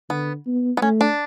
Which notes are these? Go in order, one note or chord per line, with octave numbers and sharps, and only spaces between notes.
D3 B3
B3
B3
A3 C#4
D4